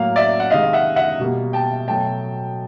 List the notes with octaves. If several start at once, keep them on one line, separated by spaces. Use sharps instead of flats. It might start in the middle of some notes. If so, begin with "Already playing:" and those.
Already playing: A2 F#3 A#3 F5
D5 E5
F#5
C3 D#3 G#3 D#5 F5
E5 F#5
E5 F#5
B2 G3 A#3
G5 A5
B2 F#3 A3 G5 A5